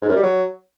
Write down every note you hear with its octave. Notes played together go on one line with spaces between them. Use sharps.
G#2
F#2
G3
F#3